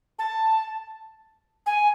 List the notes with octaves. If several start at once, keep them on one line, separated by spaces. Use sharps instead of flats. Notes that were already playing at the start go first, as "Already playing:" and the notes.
A5
G#5